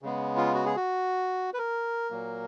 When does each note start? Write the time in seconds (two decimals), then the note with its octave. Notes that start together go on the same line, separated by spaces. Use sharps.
0.02 C#3 G#3 B3
0.37 F4
0.54 F#4
0.65 G#4
0.76 F#4
1.53 B4
1.58 A#4
2.11 A#2 F#3 A#3